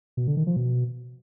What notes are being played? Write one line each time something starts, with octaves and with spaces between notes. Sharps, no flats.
B2
D3
D#3
F3
B2